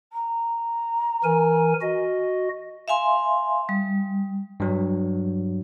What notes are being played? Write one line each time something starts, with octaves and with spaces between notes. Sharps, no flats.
A#5
E3 A#4 G#5
F#4 D#5
E5 F5 G#5 C6
G3
G2 F#3